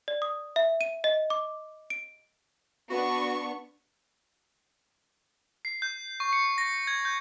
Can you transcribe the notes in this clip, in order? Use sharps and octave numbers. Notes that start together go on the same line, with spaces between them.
D5
D#6
E5
D#7
D#5
D6
D7
B3 D4 F#4 C#6
C7
G6
C#6
C#7
A#6
G#6
G6